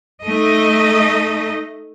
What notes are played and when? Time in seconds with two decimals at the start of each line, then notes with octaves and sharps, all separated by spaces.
0.23 A3 D#4 D#5